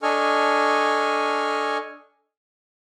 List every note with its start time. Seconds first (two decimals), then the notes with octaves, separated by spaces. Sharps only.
0.03 D4 A4 D#5 G#5 C#6 F6